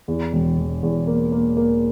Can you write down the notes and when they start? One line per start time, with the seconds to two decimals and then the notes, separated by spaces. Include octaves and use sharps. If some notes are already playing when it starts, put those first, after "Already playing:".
0.08 E2
0.33 E1
0.57 E1
0.83 E2
1.07 A#3
1.32 A#3
1.57 A#3